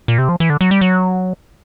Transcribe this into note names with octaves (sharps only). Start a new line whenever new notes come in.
A#2
C3
F3
E3
D3
F#3
G3
F#3